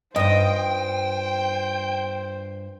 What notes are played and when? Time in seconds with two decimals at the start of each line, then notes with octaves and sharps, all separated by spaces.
0.16 G2 F4 C5 D#5 G5